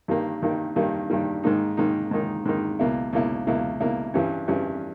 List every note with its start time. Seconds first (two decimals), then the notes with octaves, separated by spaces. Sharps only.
0.08 G2 D#3 G3 A#3
0.42 G2 D#3 G3 A#3
0.76 G2 D#3 G3 A#3
1.10 G2 D#3 G3 A#3
1.43 G#2 D#3 A#3 D#4
1.77 G#2 D#3 A#3 D#4
2.11 G#2 D#3 A#3 D#4
2.45 G#2 D#3 A#3 D#4
2.79 C#2 B2 A#3 E4
3.13 C#2 B2 A#3 E4
3.47 C#2 B2 A#3 E4
3.80 C#2 B2 A#3 E4
4.14 G2 E3 G3 C#4
4.48 G2 E3 G3 C#4